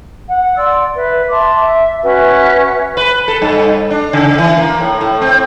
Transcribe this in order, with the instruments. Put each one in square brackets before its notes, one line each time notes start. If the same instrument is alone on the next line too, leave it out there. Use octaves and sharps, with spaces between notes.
[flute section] F#5
D5 C6 E6
B4 E5
E5 A5 C6 D6
E5
C#4 F#4 B4 E5
[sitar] B4
A4
G2
D4
C#3
E3
A#3
A2
A2
C4